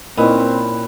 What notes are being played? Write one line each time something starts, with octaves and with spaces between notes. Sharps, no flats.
A#2 C4 C#4 D#4 E4 B4 D#5